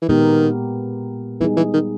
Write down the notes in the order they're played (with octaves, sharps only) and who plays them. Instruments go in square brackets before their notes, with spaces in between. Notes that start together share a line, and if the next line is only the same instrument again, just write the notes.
[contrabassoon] E3
[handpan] A#2 G#3 B3 G4 A#4 [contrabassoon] D#3
[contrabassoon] E3 [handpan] G3 B3 D#4 G#4
[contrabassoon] E3
D#3